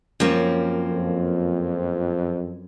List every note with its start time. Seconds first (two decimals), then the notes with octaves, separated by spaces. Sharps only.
0.20 F#2 F3 A#3 C4
0.90 F2